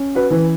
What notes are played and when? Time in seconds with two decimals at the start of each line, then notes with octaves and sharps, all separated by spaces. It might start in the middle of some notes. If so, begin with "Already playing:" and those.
Already playing: C#4
0.15 F#4 B4
0.31 E3 B4